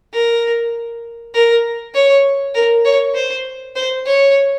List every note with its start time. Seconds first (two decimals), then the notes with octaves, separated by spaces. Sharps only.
0.13 A#4
1.34 A#4
1.95 C#5
2.55 A#4
2.85 C#5
3.15 C5
3.76 C5
4.06 C#5